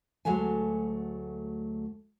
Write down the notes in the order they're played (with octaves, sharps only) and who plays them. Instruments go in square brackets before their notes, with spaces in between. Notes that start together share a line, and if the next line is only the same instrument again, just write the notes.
[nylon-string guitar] D2 F#3 G#3 A3 G#5